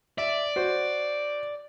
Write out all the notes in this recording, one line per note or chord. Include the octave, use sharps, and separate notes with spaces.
D5 E5
F#4 C5